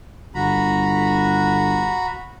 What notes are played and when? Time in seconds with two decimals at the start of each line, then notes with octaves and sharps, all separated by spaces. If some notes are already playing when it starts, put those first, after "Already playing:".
0.35 G1 F#4 A#5 B5